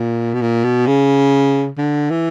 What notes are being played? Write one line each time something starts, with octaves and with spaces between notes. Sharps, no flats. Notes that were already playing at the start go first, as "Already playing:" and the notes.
Already playing: A#2
B2
A#2
B2
C#3
D3
E3